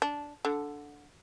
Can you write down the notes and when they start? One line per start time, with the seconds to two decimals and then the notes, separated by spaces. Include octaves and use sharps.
0.02 D4
0.45 D3